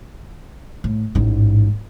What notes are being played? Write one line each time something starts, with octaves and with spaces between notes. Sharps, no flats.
A2
A1 G#2